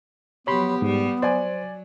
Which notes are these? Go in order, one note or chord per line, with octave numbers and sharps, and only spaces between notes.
F3 F#3 B3 G4 C#5 B5 C6
G#2 G3
F#3 C5 D5 G#5